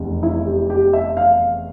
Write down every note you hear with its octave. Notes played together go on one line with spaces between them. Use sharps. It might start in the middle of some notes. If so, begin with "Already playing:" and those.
Already playing: F1 E2
E4
G4
G4
E5
F5